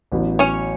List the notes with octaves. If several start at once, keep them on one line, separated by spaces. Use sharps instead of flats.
A1 A2 F#3 B3
C#4 C#5